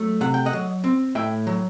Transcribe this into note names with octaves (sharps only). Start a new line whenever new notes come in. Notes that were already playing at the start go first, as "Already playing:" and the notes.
Already playing: F#3 A3
C3 F#5
G5
D#5 F#5
F#3
C4
A2 E5 G5
F#3